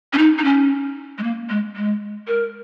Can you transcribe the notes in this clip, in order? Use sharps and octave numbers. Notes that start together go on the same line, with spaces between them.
C#4
D#4
D#4
C#4
G#3
A#3
G#3
G#3
A#4